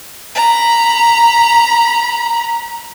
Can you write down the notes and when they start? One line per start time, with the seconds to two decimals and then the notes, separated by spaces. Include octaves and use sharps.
0.35 A#5 B5